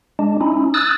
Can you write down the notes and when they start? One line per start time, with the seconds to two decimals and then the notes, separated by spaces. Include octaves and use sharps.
0.19 G#3 D4
0.41 C#4 D#4 E4
0.74 D#6 E6 F#6 A6